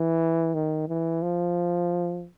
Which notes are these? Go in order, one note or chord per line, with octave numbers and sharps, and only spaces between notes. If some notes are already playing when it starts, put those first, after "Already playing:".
Already playing: E3
D#3
E3
F3